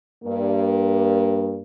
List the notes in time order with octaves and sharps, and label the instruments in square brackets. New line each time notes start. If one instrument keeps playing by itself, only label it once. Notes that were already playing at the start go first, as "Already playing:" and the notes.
[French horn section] G2 A#3